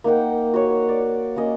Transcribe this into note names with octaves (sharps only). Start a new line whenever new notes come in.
A#3 D#4 F#5 G5
F#4 C#5
D5
A#3 C#4 D#5